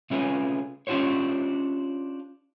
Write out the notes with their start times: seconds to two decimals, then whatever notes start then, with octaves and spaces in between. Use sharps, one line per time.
0.10 C3 A3 C#4 F4 G#4 B4
0.87 C#4 D4 F4 G4 C5 C#5